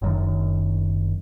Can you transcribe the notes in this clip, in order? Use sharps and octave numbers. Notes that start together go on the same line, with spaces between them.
F#1 F#2 D#3